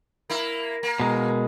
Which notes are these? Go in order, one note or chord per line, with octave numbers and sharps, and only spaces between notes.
A#3 E4
A#3
B2 G#3